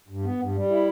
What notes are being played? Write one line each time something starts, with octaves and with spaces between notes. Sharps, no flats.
G2
B3
G2
G3
E4